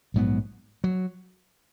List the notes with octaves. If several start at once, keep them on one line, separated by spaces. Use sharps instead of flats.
A#1 G#2 F#3 B3
F#3